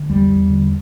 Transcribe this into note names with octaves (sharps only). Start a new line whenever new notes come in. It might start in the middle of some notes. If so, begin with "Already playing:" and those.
Already playing: D3
E2 G3
E2
D3